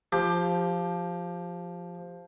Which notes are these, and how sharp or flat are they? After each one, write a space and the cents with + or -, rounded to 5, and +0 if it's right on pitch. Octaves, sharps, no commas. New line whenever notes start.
F3 +0 G4 +20